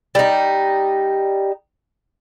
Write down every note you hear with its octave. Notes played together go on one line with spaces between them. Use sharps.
G3 D#4